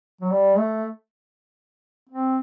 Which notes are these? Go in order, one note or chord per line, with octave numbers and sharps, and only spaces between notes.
F#3
G3
A3
C4